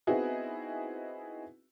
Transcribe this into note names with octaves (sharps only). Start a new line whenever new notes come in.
B3 C4 D#4 E4 F#4 G#4